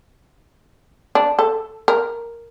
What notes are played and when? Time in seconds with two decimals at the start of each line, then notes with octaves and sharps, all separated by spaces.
1.15 D4
1.39 A4
1.88 A#4